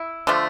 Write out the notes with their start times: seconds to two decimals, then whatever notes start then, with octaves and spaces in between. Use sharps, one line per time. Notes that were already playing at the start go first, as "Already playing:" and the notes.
Already playing: E4
0.27 D3 F3 A3